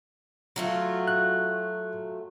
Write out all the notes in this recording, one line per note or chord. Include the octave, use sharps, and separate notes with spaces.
F#3 A3 F4
F#6